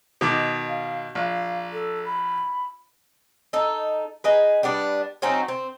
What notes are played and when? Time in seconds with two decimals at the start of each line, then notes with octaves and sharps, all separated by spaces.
0.21 B2 D#3 D6
0.69 F5
1.15 A#1 F5
1.73 A4
2.05 B5
3.53 D#4 A4
4.24 D#4 G#4 B4
4.63 G3 B3 D4
5.22 F#3 C4 C#4 D#4
5.48 C4